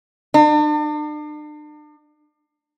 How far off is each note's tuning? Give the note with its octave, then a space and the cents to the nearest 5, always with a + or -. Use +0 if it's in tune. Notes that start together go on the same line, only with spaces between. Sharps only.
D4 +40